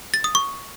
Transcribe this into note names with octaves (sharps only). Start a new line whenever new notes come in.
A6
D#6
C#6